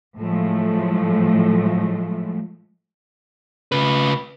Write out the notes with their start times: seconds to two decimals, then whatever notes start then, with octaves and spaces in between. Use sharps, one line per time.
0.18 A2 F3 F#3 G#3 A3
3.72 C#3 B4